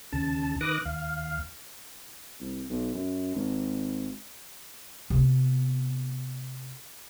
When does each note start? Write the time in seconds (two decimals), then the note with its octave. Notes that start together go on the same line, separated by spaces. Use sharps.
0.12 D#2 C#3 A5
0.61 D#3 B4 D6 D#6 F#6 A#6
0.85 D#2 F5
2.40 C2
2.69 B1
2.94 F#2
3.35 G#1
5.10 C3 B3